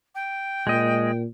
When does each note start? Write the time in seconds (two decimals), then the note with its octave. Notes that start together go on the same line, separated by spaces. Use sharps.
0.15 G5
0.67 A#2 G#3 D#5